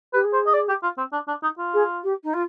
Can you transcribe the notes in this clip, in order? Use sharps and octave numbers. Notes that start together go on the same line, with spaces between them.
G4 B4
G#4
C5
D#5
D5
G4
F4
C4
D4
D4
D#4
F4
G#4
G4
D#4
F4